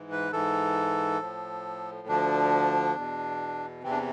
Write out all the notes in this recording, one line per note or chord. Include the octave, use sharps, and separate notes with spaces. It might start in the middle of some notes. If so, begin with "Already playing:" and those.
Already playing: G#2 E3
B4
G#2 E3 A4
A2 F3
D2 D3 F3 D4
E2 B2
E2 C3 E3 C4
D4